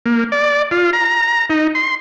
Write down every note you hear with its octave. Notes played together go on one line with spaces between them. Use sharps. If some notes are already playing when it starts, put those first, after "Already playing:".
A#3
D5
F4
A#5
D#4
C6